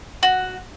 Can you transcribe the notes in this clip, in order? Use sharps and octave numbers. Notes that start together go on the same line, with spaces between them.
F#4